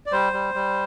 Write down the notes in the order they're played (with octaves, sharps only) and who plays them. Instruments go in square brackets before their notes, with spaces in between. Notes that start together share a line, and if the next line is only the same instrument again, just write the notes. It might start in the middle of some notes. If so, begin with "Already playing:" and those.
[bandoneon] D5
G3 C5
G3
G3